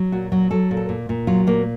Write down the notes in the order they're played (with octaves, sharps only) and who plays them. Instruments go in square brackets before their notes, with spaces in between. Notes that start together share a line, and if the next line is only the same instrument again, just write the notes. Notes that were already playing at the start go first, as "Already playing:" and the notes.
Already playing: [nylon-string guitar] F#3
A#2 F#4
F#3 F#4
F#3 A4
A#2
A4
A#2
A#2
F#3 F4
A#2 A#3